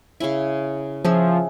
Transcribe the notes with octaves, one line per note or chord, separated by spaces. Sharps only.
C#3 C#4 E4
F3 C#4 G#4 E5